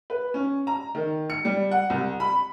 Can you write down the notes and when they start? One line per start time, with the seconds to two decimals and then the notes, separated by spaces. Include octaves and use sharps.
0.10 B4
0.34 C#4
0.67 A#5
0.95 D#3
1.30 C#7
1.45 G3
1.71 F#5
1.90 C2
2.20 B5